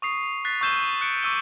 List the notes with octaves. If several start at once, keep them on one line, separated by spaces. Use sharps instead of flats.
C#6 D#6 C7
F#6 A6 B6 C7
C#6 E6 G6 D#7 E7 G7
F#6 C#7 D7
C#6 D6 E6 D#7 G7